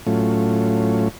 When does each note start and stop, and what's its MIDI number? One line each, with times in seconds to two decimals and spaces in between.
0.07 1.08 45
0.07 1.08 54
0.07 1.08 57
0.07 1.08 61
0.07 1.08 65